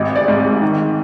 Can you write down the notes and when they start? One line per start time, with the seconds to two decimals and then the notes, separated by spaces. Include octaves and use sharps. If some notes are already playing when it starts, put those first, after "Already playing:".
Already playing: G#1 D#5
0.16 D5
0.28 G#2
0.39 G#4
0.62 D#3